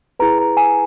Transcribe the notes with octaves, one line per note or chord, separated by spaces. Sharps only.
E4 G#4 B4 A#5
A#5
G#5